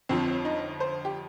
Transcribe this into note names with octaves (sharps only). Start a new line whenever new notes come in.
G1 F2 F3 C4
D#4
C5
G4